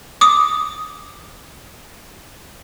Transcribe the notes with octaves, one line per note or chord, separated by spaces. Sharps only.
D6 D#6